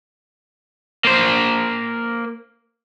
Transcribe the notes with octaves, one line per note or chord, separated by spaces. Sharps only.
A#3 C5